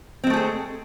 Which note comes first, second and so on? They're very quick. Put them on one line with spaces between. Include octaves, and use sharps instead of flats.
C4 G#3 A3 G#4 A4